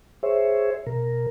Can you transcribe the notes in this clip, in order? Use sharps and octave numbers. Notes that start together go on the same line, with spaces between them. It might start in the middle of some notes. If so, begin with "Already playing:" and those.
G#4 C5 C#5 E5
B2 A#4